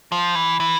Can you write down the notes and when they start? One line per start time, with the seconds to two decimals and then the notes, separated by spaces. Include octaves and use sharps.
0.12 F3
0.35 E3
0.60 E3